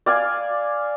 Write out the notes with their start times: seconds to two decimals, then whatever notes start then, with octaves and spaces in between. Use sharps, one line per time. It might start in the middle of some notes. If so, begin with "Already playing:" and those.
0.06 D5 F5 G#5